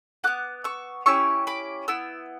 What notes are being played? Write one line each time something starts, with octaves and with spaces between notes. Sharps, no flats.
B3 F#4 D6 F#6
C#6 E6
C#4 E4 G4 C#6 E6
B5 D6
B3 E4 E6